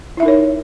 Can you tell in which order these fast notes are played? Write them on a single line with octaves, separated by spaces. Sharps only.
E4 E5 D#4 A#4 C#5